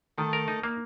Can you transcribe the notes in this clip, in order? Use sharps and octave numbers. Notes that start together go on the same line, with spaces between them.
D#3 A3
A#4
D#4
A#3